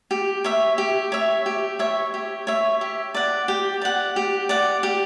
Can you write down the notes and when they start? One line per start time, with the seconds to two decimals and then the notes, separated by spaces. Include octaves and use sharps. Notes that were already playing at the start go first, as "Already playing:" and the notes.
0.11 G4
0.44 C#5 E5
0.78 G4
1.12 C#5 E5
1.46 G4
1.79 C#5 E5
2.14 G4
2.47 C#5 E5
2.81 G4
3.14 D5 F#5
3.48 G4
3.82 D5 F#5
4.16 G4
4.49 D5 F#5
4.83 G4